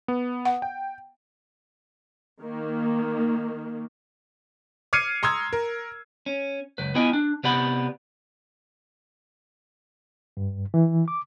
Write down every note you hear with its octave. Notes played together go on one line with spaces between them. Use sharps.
B3
F#5
G5
D#3 A#3
D6 F6 G#6 C7 C#7 D#7
A#5 C6 D#6 E6 G#6
A#4
C#4
C#2 F#2 B4
B3 E4 F4 D#5 G5 G#5
D4
C3 B3 G4 D5 F#5 B5
G2
E3
D6